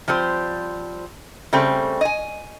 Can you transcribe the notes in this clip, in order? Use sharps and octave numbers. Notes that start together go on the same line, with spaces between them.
F3 G3 C4 C5
C#3 G3 A3 C4
D#5 G#5